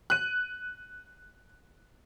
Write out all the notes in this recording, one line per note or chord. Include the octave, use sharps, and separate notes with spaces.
F#6 D#7